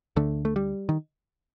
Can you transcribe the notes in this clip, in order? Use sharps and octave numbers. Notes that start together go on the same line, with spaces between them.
D2 D3 A3
A3
G3
D#3